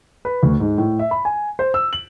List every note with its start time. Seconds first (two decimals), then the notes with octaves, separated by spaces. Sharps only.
0.25 B4
0.43 D2
0.60 G#2
0.78 A2
0.99 E5
1.11 B5
1.25 G#5
1.59 C5
1.74 E6
1.93 F#7